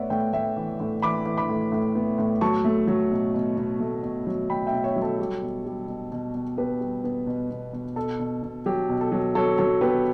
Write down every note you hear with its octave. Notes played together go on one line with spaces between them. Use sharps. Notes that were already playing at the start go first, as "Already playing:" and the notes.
Already playing: A2 B3 C#5 D5 E5 F#5
A2 E5 G5
A2 E5 G5
E3
A2
E3 B5 D6
E3
B5 D6
A2
A2
B3
A2
F#3 A5 C#6
A3
F#3
B2
B2
B2
A3
B2
F#3
B2 G5 B5
E5 G5
B2
C#5 E5
F#3
A4 C#5
G3
B2
G3
B2
B2
B2
B3 G4 B4
G3
B3
B2
B2
B2
B2 A4
B2
B2
F#3 G4
B2
A4
F#3
F#3 A4 C#5
F#3 A4 C#5
B3 G4 B4